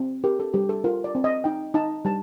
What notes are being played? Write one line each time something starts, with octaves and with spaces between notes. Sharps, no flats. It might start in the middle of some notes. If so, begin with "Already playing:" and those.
Already playing: C4
G4 A#4
A4
G3 G4
A4
F4 A#4
D5
C4
D#5
D#4 G5
D#4 A5
G3 A5